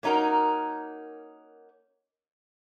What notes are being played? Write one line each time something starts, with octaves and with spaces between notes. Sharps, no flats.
A#3 C#4 D#4 F#4 A#4